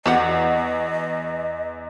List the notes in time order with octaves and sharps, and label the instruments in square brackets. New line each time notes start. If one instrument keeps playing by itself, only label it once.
[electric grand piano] E2 [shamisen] F#4 G4 F#5 [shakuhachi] D#5